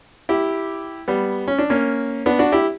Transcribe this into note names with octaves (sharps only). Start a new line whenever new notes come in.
E4 G4
G3 B3
C#4
D4
A#3 C#4
B3 D4
D4 F#4
E4 G4